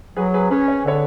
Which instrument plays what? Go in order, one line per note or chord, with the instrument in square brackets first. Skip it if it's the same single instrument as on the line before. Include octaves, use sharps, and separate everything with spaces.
[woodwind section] F#3 [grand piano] G#4 B4
[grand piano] G#4 B4
[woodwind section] C#4 [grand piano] G#4 B4
[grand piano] C#5
[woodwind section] D3 [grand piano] A4 C#5